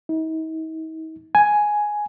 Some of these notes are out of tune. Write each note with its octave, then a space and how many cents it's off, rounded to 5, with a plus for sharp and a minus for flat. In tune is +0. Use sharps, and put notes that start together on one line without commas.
D#4 +45
G#5 +5